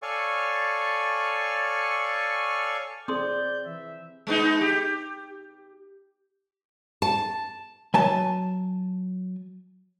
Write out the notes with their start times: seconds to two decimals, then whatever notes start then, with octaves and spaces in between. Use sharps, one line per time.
0.02 A4 C#5 D5 F5 G#5 C#6
3.08 C4 G#4 D5 C6 D#6 G6
3.66 E3 E5
4.27 G#3 B3 D#4
4.61 G4
7.02 A5
7.94 F#3 G#5 A5